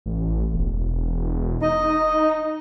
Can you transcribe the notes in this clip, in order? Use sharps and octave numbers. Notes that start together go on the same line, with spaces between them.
A1
E1
D#4 D#5